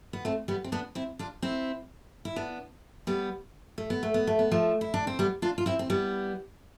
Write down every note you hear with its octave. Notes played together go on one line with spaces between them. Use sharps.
B3
A3 C4
G3 B3
C4
B3 D4
C4 E4
D4 F4
C4 E4
E4
B3 D4
G3 B3
A3
B3
A3
B3
A3
B3
F3 A3
E4
D4
C4
G3 B3
D4 F4
F4
C4 E4
C4
G3 B3